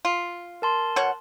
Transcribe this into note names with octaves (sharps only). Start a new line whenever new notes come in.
F4
A#4 A5 C6
B2 C#5 F#5